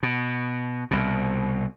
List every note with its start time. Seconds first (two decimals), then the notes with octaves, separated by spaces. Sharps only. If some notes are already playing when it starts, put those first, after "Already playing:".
0.03 B2
0.91 C2 B2